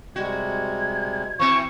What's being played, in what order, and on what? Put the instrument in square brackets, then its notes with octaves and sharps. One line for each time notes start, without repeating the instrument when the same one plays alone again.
[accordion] C3 G3 G#3 [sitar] F#4 [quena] G#6
[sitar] E3 C4 [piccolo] C#6